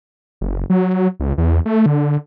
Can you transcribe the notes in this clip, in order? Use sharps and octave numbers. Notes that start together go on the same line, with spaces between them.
F#1
F#3
C#2
E2
A3
D3